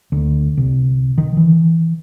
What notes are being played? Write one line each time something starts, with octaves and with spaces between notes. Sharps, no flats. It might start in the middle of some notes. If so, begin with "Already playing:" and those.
D2
C2
D#3
E3